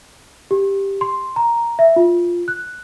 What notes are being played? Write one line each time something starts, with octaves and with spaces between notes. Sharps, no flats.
G4
C6
A#5
E5
F4
F#6